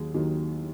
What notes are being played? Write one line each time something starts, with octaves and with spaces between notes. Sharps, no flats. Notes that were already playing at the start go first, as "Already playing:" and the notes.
Already playing: D#2 D#3 F#3 G#4
D#2 D#3 F#3